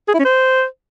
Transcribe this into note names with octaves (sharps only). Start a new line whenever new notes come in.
G#4
E4
C#4
C5